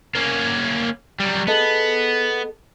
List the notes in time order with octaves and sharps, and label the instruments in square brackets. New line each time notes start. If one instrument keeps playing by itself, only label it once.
[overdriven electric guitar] A#3 C#4
F#3 G3
[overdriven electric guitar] B3 [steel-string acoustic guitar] G#4 A4 D#5